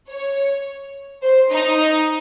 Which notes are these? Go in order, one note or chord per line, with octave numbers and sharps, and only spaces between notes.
C#5
C5
D#4